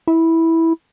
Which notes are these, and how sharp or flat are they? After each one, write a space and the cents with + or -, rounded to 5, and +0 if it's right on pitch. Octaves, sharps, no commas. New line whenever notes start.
E4 -10